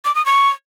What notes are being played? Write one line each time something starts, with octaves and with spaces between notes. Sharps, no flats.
D6
D#6
C#6